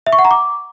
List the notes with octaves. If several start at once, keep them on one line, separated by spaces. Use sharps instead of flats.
E5
C#6
F#5
A#5
D6